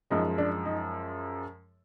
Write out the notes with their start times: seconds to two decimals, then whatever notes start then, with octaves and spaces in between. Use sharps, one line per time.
0.10 F#2 F3 G#3 D#4
0.38 D4
0.65 D#4